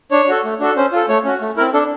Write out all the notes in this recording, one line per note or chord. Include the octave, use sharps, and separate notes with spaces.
D4 C#5
F#4 A4
A3
D4 F#4 A4
C#4 C5
F4 A4
A3 C#5
C#4 F#4
A3
C4 E4 A#4
D4 A4